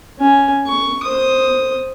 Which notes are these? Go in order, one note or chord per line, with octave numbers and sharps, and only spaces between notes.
C#4 G#5
C#6
C5 D#6